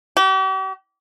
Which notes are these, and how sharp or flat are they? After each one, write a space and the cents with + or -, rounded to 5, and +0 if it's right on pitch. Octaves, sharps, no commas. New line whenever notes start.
G4 -45